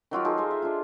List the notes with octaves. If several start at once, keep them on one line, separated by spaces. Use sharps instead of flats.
D#3 F#3 F4 G4
D#4 F4 G#4 A4
C5 D#5 G#5
E5
D4 F4